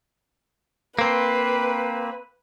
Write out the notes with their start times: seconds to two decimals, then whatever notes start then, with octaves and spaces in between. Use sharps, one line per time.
0.99 A#3 C4 B4